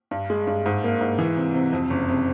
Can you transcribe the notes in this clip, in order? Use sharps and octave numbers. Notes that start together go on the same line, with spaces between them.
G2
G#3
G2
G#2
A#3
G#2
E3
C3
C3
F2
F#1
C3